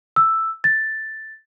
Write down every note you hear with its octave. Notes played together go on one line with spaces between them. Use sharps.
E6
A6